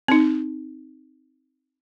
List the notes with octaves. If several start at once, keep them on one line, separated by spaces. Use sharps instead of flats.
C4 D#4